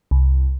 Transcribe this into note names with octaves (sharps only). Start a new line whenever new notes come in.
C2